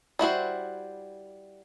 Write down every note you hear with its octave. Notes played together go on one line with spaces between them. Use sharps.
G3 E4 F#4 C5